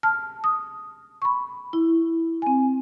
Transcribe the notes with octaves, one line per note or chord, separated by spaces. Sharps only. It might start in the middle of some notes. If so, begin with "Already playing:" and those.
A5 F6
D#6
B5 C#6
E4
C4 G#5